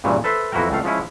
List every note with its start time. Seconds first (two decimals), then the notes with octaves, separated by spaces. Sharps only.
0.04 G2 A#2 C#3 E3
0.24 A4 B4 C5 E5
0.52 F2 E3 E4 F#4 A#4 G5
0.70 C#2 A3 F5
0.84 F3 G#3 C#4 E4